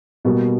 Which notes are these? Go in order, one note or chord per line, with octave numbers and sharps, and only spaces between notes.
B2 G3 A#3